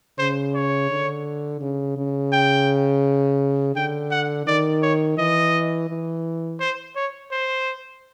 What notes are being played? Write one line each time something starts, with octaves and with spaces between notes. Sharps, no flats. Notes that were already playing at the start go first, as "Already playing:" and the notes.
C#3 C5
C#5
D3
C#3
C#3
G5
D3 G5
F#5
D#3 D5
C#5
E3 D#5
E3
C5
C#5
C5